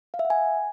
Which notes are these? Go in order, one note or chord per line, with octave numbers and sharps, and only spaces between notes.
F5
E5
F#5
G#5